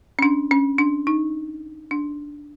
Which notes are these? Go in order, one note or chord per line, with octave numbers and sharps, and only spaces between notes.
C#4
D4
C#4
D4
D#4
D4